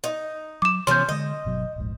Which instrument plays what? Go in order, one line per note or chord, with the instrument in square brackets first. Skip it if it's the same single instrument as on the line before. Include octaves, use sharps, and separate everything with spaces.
[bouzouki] D#4
[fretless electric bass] F#3 [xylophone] D6 E7
[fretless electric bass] C3 E3 B3 [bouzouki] F3 C#4 [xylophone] C6 G6
[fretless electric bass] D3 G#3 [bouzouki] D#5
[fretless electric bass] G1 B2 F#3
D1 A#1 G#2